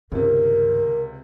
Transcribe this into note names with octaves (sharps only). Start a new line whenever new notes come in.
C#2 G2 C3 D#3 A#4